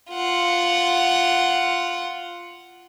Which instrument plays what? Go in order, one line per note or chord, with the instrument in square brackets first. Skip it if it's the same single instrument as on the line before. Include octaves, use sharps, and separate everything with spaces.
[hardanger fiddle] F4 F#5